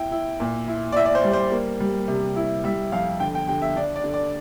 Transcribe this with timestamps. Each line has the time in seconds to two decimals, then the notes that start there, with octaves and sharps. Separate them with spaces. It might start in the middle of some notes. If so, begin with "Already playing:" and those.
Already playing: E4 G5
0.11 E4
0.40 A#2
0.68 E4
0.92 D5
0.96 E4 E5
1.06 D5
1.15 C5
1.24 G3
1.33 C5
1.52 A#3
1.80 G3
2.08 C3
2.36 E4
2.64 G3 E5
2.92 F2 F5
3.20 D3 G5
3.35 G5
3.48 D3 G5
3.62 E5
3.76 D4 D5
3.96 D5
4.04 D3
4.14 D5